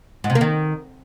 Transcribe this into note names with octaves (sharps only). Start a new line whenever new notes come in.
G#2
C3
A#3
D#3